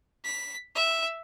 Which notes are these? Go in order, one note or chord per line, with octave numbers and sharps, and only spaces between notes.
B6
E5